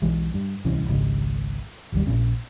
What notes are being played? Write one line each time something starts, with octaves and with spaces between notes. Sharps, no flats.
B1 E3 G#3
G2
D1 C2 E3 C#4
G#1 C#2 G#2 C#3
G#1 D#2 G3
A#1 A#2 C#4